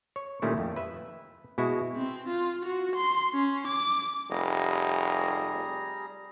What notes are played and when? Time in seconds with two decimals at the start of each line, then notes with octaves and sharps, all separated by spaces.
0.16 C#5
0.42 A#2 D#3 G3 A3 C#4 E4
0.58 F2
0.76 B4 E5
1.58 B2 G#3 E4 F#4
1.96 C4
2.28 F4
2.65 F#4
2.96 C6
3.34 C#4
3.67 D6
4.31 F1 G3 G#4 A#5